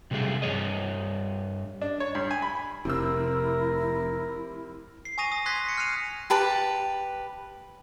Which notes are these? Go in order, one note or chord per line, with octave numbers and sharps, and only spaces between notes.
C3 F#3 G3 A3 G#4
G2 A3 C#5 D#5
D4
C#5
G2
G#5
B5
F1 C3 C4 E4 A#4 E6
C7
G#5 C#6 D#6 A#6 D#7 F7
D#6
C6 F#6 G#6 A#6 B6
B6 C#7
F6 F#6 B6 C7 D#7 F7
G4 B4 A5